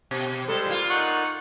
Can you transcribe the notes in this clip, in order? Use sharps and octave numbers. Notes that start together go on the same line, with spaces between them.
B2
G3 G#3 A4 C5
A#2 F4
D#4 F#5 C#6